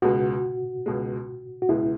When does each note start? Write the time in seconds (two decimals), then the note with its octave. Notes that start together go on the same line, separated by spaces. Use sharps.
0.02 C#2 B2 G#3 F#4
0.86 C#2 B2 G#3
1.62 F#4
1.69 C#2 B2 G#3 E4